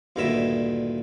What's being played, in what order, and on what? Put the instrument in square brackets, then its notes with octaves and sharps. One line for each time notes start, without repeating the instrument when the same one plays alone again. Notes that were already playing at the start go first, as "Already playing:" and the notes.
[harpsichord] D2 G2 A#2 D#3 E4 E5